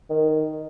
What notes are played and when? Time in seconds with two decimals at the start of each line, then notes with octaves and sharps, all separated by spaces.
0.10 D#3